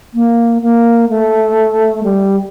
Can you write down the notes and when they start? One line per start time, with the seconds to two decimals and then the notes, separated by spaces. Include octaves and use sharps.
0.14 A#3
0.62 A#3
1.09 A3
2.03 G3